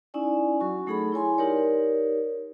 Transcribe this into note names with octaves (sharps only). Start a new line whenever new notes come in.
C#4 D#4 E4 D5 G#5
F#3 F#4 C#6
F#3 A3 D#4 G#4 A4 B5
E4 C#5 G#5 C6
D#4 G4 A#4 C#5 D5